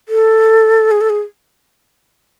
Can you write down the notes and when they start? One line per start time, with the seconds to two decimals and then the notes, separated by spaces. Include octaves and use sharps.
0.09 A4
0.91 G#4
1.01 A4
1.10 G#4